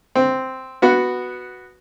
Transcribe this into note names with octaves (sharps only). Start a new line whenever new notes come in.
C4
B3 F#4